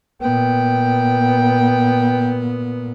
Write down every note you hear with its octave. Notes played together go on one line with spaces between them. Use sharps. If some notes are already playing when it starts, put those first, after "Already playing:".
A#2 B3 G5